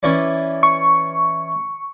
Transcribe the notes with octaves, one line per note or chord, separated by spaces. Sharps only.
E3 C#4 D5
C#6